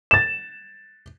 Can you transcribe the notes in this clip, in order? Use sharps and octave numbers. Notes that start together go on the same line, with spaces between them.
A6 E7